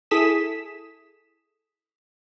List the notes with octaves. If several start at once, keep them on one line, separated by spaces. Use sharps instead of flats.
E4 G#4 A4 D#6 B6 E7